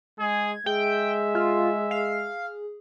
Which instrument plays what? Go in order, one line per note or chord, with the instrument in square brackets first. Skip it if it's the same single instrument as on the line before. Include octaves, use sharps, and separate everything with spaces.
[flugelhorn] G#3 [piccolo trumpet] G#4 [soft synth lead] G#6
[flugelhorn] G#3 [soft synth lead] G#4 [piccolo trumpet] E5 [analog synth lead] G5
[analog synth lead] F4
F5